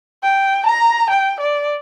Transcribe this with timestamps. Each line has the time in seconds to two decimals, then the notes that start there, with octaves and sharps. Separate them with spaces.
0.23 G5
0.66 A#5
1.10 G5
1.40 D5